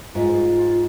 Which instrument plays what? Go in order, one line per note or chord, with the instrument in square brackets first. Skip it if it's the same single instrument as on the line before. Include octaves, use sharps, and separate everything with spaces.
[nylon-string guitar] G#2 [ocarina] F4